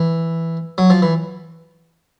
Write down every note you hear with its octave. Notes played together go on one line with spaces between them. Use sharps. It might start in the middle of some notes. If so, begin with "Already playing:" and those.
Already playing: E3
F#3
F3
E3